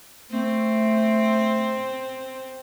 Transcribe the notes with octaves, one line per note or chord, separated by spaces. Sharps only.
A3 C4